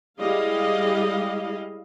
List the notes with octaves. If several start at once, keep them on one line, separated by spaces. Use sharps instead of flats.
G3 G#3 E4 G#4 D#5 F5